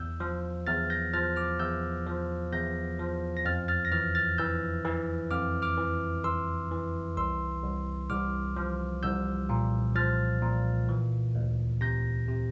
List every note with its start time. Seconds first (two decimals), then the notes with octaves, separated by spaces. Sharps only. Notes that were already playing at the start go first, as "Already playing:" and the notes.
Already playing: E2 E6 G6
0.20 F3
0.67 E2 F6 A6
0.90 G6 A#6
1.14 F3 F6 A6
1.36 D6 F6
1.59 E2 E6 G6
2.07 F3
2.53 E2 G6 A#6
2.99 F3
3.37 A#6
3.45 F2 F6 A6
3.68 F6 A6
3.85 A#6
3.92 E3 F6 A6
4.15 F6 A6
4.38 E3 E6 G6
4.85 E3
5.31 F2 D6 F6
5.62 D6 F6
5.77 E3
6.24 E3 C6 E6
6.71 E3
7.17 C2 C6 E6
7.63 C2
8.09 C2 D6 F6
8.56 F3
9.03 C2 E6 G6
9.49 A#2
9.95 F3 F6 A6
10.42 A#2
10.89 E3
11.35 D2
11.81 C3 G6 A#6
12.28 C3